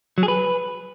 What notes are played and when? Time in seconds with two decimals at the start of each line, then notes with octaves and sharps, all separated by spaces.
0.18 F#3
0.23 G#4
0.28 B4